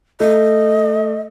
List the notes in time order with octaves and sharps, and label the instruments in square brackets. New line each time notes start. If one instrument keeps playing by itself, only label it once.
[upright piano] A3 [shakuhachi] D#5